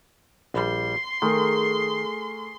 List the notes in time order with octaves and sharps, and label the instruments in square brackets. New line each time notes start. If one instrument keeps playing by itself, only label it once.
[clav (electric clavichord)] A#1 G3 [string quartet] C6
[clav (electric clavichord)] D#3 [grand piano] A3 A#4 [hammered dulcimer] G#4